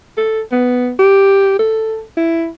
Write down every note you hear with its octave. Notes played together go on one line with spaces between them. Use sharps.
A4
B3
G4
A4
E4